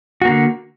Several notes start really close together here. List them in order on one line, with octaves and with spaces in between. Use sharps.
F#4 A#3 D3